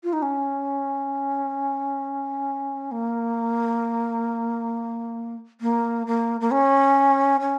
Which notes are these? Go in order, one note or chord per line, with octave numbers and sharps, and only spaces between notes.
F4
D#4
C#4
A#3
A#3
A#3
A#3
C#4
C#4